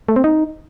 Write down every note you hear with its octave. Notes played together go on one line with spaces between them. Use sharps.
A3
C4
D#4